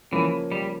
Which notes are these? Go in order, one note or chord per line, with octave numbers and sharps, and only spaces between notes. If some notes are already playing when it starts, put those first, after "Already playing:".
C#3 E3 F3 A#3 C#4
G3